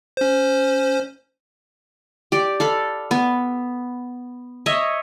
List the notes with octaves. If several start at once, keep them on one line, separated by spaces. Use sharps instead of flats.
C#4 C5
G4 D5
A4 F5 B5
B3
C#5 D#5 E5